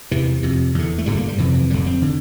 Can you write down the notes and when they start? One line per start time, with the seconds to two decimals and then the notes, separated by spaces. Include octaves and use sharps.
0.11 E2 C3 E3
0.43 F2 C3
0.75 E2 D3
0.98 A3
1.06 G2 D3 G3
1.17 A#3
1.28 G3
1.38 F2 C3 E3
1.54 E3
1.70 F2 D3 G3
1.86 C4
2.02 D3